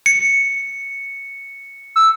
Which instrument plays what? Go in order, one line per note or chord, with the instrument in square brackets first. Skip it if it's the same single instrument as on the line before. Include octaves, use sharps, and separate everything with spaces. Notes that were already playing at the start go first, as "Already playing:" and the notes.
[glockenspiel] C#7
[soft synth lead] E6